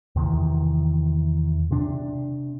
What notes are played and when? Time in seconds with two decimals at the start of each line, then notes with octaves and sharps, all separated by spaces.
0.16 E2 C3 D#3 E3
1.71 C3 D4